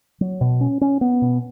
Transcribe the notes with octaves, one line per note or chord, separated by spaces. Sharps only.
F#3
B2
C#4
C#4
B3
B2